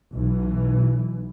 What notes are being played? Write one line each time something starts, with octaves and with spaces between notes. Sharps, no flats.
B1 E3